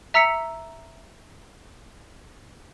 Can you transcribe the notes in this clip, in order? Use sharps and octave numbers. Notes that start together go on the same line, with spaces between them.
E5 A#5 E6 B6 C#7